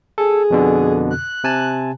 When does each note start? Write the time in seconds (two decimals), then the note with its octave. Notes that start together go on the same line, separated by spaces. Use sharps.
0.18 G#4 A4
0.50 F2 B2 D3
1.11 F#6
1.44 C3 G#5 A5